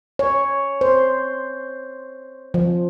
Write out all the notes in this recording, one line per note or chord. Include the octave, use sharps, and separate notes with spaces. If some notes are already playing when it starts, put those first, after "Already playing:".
C#5
C5
F3